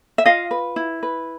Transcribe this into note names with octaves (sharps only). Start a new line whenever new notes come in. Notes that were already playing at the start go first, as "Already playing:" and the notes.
E5
F4 D#5 F5
B4
E4
B4